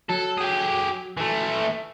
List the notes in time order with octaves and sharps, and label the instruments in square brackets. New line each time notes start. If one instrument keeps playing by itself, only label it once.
[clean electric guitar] F#3 [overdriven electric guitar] A4
[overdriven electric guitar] G4 G#4
E3 A3